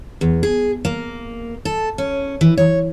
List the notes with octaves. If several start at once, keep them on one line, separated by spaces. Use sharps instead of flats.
E2
G#4
A#3
A4
C#4
E3
C#5